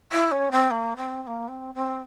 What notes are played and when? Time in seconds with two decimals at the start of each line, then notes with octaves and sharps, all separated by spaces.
0.12 E4
0.31 C#4
0.51 C4
0.70 A#3
0.96 C4
1.22 C4
1.27 A#3
1.48 C4
1.74 C4